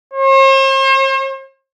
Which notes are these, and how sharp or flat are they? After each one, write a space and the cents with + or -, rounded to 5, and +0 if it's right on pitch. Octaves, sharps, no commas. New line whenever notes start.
C5 +45